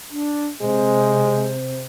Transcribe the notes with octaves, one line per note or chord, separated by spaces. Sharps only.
D4
C3 G#3 C5